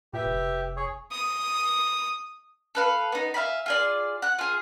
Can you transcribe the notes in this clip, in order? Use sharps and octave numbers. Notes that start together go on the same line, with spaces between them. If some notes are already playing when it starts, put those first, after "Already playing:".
A#2 G4 B4 E5
F1
G#4 C#5
D#6
A4 B4 F5
B3 D#4
E5 F5 G#5 B5
F4 G#4 D5
F#5 F#6
F4 G#4